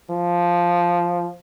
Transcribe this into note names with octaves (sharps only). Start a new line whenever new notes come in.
F3